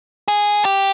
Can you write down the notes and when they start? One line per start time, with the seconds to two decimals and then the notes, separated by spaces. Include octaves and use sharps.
0.28 G#4
0.65 G4